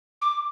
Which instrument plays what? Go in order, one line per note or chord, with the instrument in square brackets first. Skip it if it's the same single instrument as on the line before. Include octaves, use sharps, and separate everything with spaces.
[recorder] D6